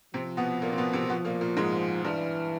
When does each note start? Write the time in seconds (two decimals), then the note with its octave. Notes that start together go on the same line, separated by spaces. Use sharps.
0.14 C3 F3 C4
0.37 B2 B3
0.62 A#2 A#3
0.72 C4
0.78 B2 B3
0.93 C3 C4
1.09 B2 F3 B3
1.25 A#2 A#3
1.41 A#2 A#3
1.57 G#2 G#3
2.05 G2 E3 G3